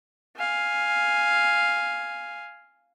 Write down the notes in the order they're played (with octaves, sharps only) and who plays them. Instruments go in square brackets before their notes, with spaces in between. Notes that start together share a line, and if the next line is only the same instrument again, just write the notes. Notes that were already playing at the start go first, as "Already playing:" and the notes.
[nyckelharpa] F5 G#5